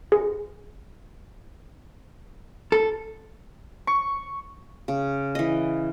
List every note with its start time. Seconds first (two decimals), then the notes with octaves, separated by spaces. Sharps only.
0.12 G#4
2.72 A4
3.87 C#6
4.88 C#3
5.35 E3 D#5